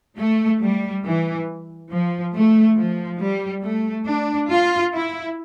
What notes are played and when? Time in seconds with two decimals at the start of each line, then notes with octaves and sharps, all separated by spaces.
0.18 A3
0.61 G3
1.05 E3
1.91 F3
2.34 A3
2.76 F3
3.20 G3
3.63 A3
4.06 D4
4.49 F4
4.93 E4